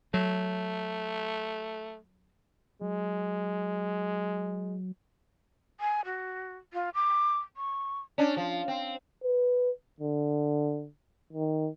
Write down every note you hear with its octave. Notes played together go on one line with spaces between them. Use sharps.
F#3 A3
F#3 G#3
G#5
F#4
F4
D6
C#6
C#4 D4
F3
C4
B4
D3
D#3